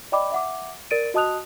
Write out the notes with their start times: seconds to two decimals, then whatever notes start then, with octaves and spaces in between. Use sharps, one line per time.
0.12 D5 D#5 G5 B5 D6
0.32 E5 F#5 D6
0.91 A#4 D5 A6 D7 D#7
1.14 F#4 D#5 A5 D#6 F#6 F7